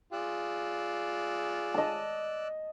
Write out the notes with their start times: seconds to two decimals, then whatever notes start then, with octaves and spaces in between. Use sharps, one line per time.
0.13 F4 G#4 D5 E6 F#6
1.74 D#5 A5